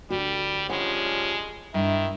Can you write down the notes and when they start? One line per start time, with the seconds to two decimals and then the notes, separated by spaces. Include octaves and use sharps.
0.10 D2 G3 F#4
0.70 F3 G3 G#3 C#4 F#5
1.74 G2 D#3 E4